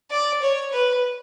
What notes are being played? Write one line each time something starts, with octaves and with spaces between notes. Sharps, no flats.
D5
C#5
B4